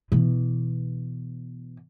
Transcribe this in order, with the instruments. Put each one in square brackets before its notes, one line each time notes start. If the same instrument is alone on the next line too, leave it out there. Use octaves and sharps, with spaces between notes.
[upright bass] B2 E3